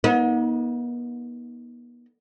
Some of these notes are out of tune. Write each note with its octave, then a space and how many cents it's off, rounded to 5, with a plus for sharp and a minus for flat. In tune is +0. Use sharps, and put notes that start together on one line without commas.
B3 -40 D#4 +25